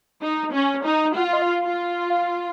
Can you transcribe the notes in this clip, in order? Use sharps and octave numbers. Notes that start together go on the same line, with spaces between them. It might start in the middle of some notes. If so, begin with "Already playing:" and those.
D#4
C#4
D#4
F4 F#5
F5
D#5
F5
F4
F5